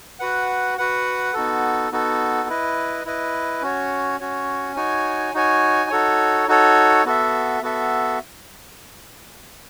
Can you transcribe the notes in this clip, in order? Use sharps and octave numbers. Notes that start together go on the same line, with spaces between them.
F#4 B4 F#5
F#4 B4 F#5
B3 D#4 F#4 A4
B3 D#4 F#4 A4
E4 B4 D#5
E4 B4 D#5
C#4 F#4 C#5
C#4 F#4 C#5
D#4 F#4 C#5 G#5
D#4 F#4 C#5 G#5
D#4 F#4 A4 C#5
D#4 F#4 A4 C#5
B3 F#4 A4 E5
B3 F#4 A4 E5